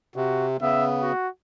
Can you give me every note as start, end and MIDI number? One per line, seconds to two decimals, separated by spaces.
0.16 0.57 48
0.16 0.47 66
0.61 1.12 49
0.61 1.12 59
0.61 0.86 76
1.03 1.28 66